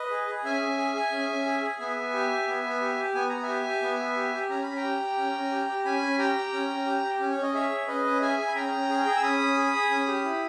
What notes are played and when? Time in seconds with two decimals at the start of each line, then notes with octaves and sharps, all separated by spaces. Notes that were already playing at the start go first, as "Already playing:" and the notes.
Already playing: B4 D#5
0.11 G#4
0.28 G#4
0.44 C#4 E5 G#5
0.62 C#4
0.78 G#4
0.95 G#4
1.12 C#4
1.29 C#4
1.46 G#4
1.63 G#4
1.79 B3 E5 G#5
1.97 B3
2.13 G4
2.30 G4
2.47 B3
2.64 B3
2.81 G4
2.98 G4
3.15 B3 G#5
3.29 B3 A#5
3.43 E5 G#5
3.48 G4
3.65 G4
3.82 B3
3.99 B3
4.16 G4
4.33 G4
4.50 C#4 A#5
4.63 C#4 B5
4.76 G5 A#5
4.84 G4
5.01 G4
5.17 C#4
5.34 C#4
5.51 G4
5.68 G4
5.85 C#4 G#5 B5
6.02 C#4
6.19 G4 G5 A#5
6.35 G4
6.53 C#4
6.70 C#4
6.86 G4
7.03 G4
7.20 C#4
7.31 C#5
7.37 C#4
7.42 D#5
7.53 G#4 C#5 E5
7.71 G#4
7.88 C#4 B4 D#5
8.05 C#4
8.21 G#4 E5 G#5
8.38 G#4
8.48 B5
8.55 C#4 G5 A#5
8.72 C#4
8.90 G#4
9.06 G#4
9.17 E6
9.23 C#4 B5 D#6
9.40 C#4
9.57 G#4
9.73 G#4
9.91 C#4
10.07 G4
10.24 E4